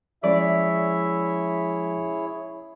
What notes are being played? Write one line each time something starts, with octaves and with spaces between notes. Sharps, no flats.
F3 G#3 C#4 E4 G#4 C#5 D5 E5